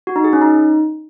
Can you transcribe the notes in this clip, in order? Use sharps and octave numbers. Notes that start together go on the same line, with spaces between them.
F#4
D#4
G#4
C#4
D#4